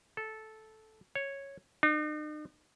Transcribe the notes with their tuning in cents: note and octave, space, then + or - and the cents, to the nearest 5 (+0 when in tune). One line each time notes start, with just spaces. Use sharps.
A4 -10
C#5 -5
D#4 -45